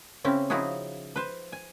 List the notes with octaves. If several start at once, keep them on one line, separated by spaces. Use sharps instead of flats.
C#3 C4 C#4 E4
C#3 F3 D#4 E4 F#4 G#4
B4 C5
G#5